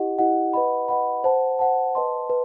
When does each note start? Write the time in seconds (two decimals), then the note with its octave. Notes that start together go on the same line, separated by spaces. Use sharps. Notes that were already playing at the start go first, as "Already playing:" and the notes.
Already playing: E4 G4 D#5 F#5
0.19 E4 G4 D#5 F#5
0.54 B4 D#5 F#5 B5
0.88 B4 D#5 F#5 B5
1.24 C5 F#5 A5
1.59 C5 F#5 A5
1.95 B4 D#5 A5 C6
2.29 B4